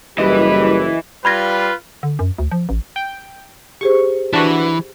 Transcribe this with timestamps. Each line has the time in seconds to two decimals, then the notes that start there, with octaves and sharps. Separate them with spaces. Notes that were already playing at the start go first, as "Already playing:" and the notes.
0.18 F#1 E3 G3 G4 B4 D#5
1.25 G3 F4 B4 B5 G#6 A#6
2.03 D3
2.19 F#2
2.38 D2
2.51 F3
2.69 A1
2.96 G5
3.81 G4 G#4 C5 C#6
4.33 E3 D4 F#4 B4